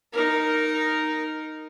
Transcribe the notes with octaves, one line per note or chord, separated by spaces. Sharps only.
D#4 A#4